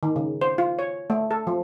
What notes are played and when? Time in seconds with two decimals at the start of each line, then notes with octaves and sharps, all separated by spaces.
0.03 D#3
0.16 C#3
0.41 C5
0.58 F4
0.79 C#5
1.10 A3
1.31 A4
1.47 F3